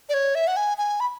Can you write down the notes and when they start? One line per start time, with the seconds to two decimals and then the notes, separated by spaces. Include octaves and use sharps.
0.09 D5
0.14 C#5
0.35 E5
0.47 F#5
0.57 G#5
0.78 G#5
1.00 B5